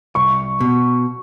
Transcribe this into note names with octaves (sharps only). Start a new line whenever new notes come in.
C2 C#6
B2